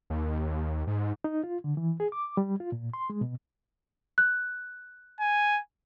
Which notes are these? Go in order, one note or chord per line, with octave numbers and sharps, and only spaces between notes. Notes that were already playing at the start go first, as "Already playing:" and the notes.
D#2
G#2
D#4
F4
D3
E3
G#4
D6
G3
F4
A#2
C6
G#3
B2
F#6
G#5